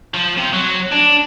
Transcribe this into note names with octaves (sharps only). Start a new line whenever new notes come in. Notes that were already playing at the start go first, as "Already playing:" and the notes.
F3
C3
F#3
D4